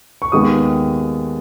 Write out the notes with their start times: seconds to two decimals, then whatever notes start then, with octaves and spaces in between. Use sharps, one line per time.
0.22 C#6
0.32 D#2 D#3 G#3 B3 D#6